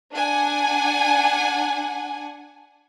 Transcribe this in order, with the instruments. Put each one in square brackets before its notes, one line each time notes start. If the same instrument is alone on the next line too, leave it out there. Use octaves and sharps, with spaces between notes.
[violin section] D4 F#5 G#5